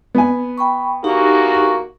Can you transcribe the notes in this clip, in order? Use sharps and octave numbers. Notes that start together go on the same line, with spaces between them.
B3 G#5
G5 B5 C#6
E2 A#3 D#4 F#4 G4